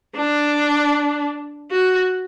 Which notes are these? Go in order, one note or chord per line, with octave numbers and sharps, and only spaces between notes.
D4
F#4